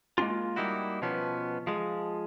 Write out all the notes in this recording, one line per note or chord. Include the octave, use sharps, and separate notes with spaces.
G#3 A#3 C#4 D4 F4
G3 A#3 D#4 E4 F#4
B2 F3 B3 C#4
F3 G#3